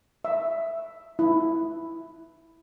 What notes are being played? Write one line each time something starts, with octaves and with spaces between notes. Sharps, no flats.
E5
E4